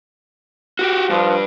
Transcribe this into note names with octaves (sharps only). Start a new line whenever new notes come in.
F#4 G4
G2 F3